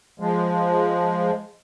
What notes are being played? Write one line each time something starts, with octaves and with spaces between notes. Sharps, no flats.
F3 G#3